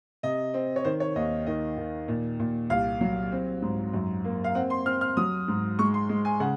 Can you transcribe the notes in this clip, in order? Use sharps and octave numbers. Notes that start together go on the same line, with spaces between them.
C3 D#5
C4
C#5
D#3 C5
C#5
D#2 D#5
D#3 D#5
D#3
A#2
A#2
C2 F5
F#3
C4
G#2
F#2
A#3
F5
C4 F#5
C6
C4 F6
F6
F#3 D#6
G#2
G#3 C#6
C6
G#3
G#5
C#3 F#5